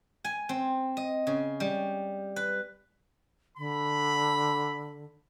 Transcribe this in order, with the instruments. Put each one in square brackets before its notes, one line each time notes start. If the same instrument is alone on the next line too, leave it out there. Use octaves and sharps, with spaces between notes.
[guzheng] G#5
C4
D#5
C#3
G3
B4
[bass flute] D3 [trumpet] B5